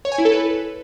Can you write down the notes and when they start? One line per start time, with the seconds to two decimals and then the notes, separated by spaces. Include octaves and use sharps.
0.05 C#5
0.12 G#5
0.18 E4
0.25 A4
0.32 B4